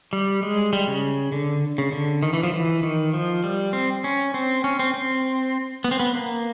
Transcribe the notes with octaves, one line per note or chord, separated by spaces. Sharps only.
G3
G#3
G3
C#3
D3
C#3
D3
D#3
E3
F3
E3
D#3
F3
G3
C4
C#4
C4
C#4
C4
C4
B3
C4
B3
A#3